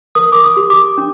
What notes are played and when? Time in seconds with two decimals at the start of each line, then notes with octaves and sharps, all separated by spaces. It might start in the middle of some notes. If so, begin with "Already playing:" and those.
0.15 A#4 D#6
0.32 D6
0.44 D#6
0.57 G4
0.70 D6
0.98 D4